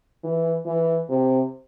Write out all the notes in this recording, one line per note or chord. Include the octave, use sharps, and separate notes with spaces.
E3
E3
C3